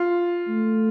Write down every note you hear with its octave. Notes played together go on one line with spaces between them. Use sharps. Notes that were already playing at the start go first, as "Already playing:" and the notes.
Already playing: F4
A3